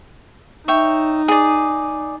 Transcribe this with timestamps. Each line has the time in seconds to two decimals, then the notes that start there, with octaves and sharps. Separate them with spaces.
0.68 D#4 C#5 E5 G5
1.28 G#4 D5